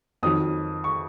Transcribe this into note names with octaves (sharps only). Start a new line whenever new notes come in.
F2 D#3 F#3 D#6
C#6